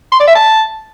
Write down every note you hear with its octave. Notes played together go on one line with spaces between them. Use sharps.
C6
D5
E5
A5